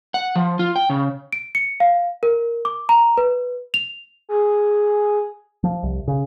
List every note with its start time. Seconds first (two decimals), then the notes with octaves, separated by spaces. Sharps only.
0.14 F#5
0.36 F3
0.59 F4
0.76 G5
0.90 C#3
1.33 D7
1.55 C#7
1.80 F5
2.23 A#4
2.65 D6
2.89 A#5
3.17 B4
3.74 F7
4.29 G#4
5.64 F3
5.83 C2
6.08 C#3